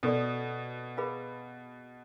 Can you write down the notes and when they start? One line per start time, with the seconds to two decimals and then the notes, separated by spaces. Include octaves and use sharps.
0.03 B2 F#4 A4 D5
0.97 G#4 B4 F5 B5